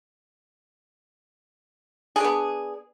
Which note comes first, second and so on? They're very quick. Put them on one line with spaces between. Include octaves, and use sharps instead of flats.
G#4 D4 B3